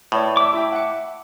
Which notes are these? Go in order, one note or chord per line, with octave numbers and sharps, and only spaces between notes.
A2 B4 C#5 D5
E5 D6
E4 G5
F#5 C#7